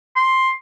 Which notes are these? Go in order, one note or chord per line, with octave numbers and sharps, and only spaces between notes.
C6